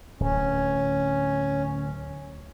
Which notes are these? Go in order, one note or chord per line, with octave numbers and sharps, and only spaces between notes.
D1 C#4